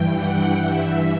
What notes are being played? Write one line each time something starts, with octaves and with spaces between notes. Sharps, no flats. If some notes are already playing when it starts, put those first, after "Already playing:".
Already playing: G2 E3 G5
F#5
G2 E3 E5